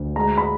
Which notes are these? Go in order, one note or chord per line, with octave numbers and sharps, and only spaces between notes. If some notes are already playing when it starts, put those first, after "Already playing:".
Already playing: D2
G#3 A#5
B5